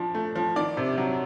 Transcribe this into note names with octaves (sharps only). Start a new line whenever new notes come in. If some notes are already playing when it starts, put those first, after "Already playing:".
Already playing: F3 D4
A3
F3
D#3 D5
C3
F#3